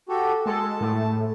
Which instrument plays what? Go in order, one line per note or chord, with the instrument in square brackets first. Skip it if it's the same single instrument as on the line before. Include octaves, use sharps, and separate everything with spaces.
[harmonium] F#4 G4 A4
[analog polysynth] G#3 A4 [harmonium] A5
[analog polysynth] A2 A3